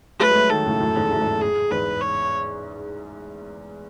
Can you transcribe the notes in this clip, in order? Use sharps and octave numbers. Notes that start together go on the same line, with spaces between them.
F#3 A3 B4
G#3
F#3 A3
D#3 F#3 A4
A2 C#3
F#2 A2
E2 G#2
F#2 A2
E2 G#2
G#4
E2 G#2 B4
C#5